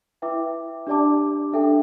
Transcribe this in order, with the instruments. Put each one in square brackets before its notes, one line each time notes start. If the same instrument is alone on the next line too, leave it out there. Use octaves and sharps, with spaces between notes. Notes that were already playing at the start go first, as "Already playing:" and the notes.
[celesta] E4 B4 E5 G5 D6
D4 G4 D5 A5 D6
D4 A4 E5 G5